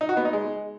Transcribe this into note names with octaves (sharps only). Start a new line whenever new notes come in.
D#4
F#4
B3
D#4
G#3